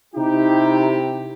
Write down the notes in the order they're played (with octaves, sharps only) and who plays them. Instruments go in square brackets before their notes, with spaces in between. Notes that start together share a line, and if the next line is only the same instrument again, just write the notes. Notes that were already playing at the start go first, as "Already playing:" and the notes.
[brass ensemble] C3 E4 G4 [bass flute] D#4